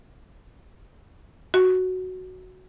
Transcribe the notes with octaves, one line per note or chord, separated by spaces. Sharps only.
F#4